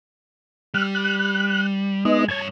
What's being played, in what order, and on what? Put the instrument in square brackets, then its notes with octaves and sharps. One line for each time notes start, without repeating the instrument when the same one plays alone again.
[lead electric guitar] G3 [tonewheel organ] F6 F#6
[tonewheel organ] F#6
[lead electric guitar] G#3 [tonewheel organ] B3 D#4 D#5
[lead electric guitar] G2 C#5 [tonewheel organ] A5 G#6